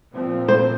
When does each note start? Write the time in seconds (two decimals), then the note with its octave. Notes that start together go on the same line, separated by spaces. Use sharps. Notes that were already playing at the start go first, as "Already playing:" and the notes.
0.12 A#2 F3 C4
0.48 C5